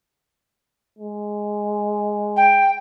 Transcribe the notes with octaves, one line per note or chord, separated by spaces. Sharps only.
G#3
G5